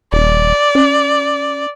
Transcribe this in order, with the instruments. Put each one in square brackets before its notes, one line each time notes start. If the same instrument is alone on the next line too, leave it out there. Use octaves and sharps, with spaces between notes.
[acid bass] D#1 [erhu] D5
[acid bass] C#4